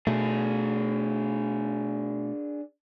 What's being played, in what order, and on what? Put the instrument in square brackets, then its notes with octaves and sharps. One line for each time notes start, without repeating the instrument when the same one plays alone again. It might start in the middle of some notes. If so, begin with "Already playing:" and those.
[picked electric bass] B2 A3 [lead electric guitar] D4 G#4